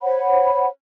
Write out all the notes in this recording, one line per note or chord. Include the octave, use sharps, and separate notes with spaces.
C5 C#5 F#5 B5